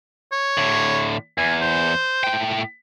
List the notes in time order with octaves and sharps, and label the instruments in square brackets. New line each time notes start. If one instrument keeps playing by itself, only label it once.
[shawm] C#5
[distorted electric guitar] A2 D3
[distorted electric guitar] E2 [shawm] G#5
[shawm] C5
[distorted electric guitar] A2 G5